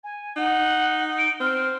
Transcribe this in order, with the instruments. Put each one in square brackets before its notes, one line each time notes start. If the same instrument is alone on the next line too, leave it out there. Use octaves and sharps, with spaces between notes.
[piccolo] G#5
[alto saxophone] D#4 [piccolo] F#5
[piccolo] D7
[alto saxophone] C4 [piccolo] F6